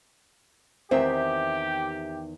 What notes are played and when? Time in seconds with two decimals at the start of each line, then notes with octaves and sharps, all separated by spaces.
0.91 E2 D#3 C4 G4 E5